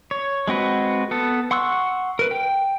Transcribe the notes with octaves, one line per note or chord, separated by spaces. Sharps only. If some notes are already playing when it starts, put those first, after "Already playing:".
C#5
G#3 C4 F#4 B4
B3 A4
F#5 C6 C#6 E6 F#6
A#4 B4
G5